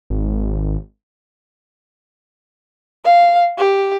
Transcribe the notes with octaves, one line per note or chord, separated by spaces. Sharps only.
G#1
F5
G4